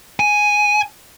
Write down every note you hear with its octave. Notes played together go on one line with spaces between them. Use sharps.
G#5